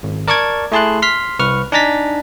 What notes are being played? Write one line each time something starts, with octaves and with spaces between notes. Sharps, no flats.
G#1
A#4 D5 A5 C#6 D6 G#6
A3 E4 G#4 A5 C6 F#6
C6 F6 B6
C2 B4 C#6 F6
D4 D#4 G#5 A#5 A6 B6